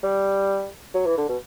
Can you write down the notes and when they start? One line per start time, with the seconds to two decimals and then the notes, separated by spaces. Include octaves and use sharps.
0.03 G3
0.94 F#3
1.06 E3
1.18 D3
1.29 B2